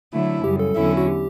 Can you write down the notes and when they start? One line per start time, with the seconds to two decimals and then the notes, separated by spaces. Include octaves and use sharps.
0.12 D3 F#3 A3 E4
0.44 F#2 C#3 G3 G4
0.59 A4
0.75 E2 D3 F#3 C#4 E4
0.97 F#4
1.07 G4